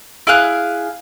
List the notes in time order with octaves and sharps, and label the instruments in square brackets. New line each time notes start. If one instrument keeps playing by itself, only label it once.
[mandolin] E4 G#4 F5 F#6